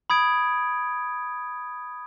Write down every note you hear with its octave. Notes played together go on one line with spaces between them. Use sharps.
B5 D#6 G#6 D7